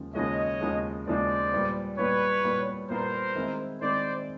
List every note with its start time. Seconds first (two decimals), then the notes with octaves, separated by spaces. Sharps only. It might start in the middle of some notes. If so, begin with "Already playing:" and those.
Already playing: D#2 C#3 F3 G#3
0.15 D#2 C#3 F3 G#3 C#5 D#5
0.61 D#2 C#3 F3 G#3
1.07 D#2 C#3 F3 G#3 C5 D5
1.52 A#2 G3 B3
1.98 A#2 G3 B3 B4 C#5
2.44 A#2 G3 B3
2.90 A#2 G3 B3 A#4 C5
3.35 D#3 G#3 C4 E4
3.81 D#3 G#3 C4 E4 C5 D5